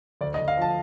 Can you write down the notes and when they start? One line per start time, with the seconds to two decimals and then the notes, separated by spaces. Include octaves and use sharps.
0.21 D2 D5
0.34 D#5
0.39 D2
0.48 F5
0.57 F3 A5